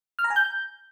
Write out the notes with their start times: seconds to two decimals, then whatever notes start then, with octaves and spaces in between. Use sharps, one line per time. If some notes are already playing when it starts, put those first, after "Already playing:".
0.19 F6
0.24 A#5
0.30 G#5
0.36 G6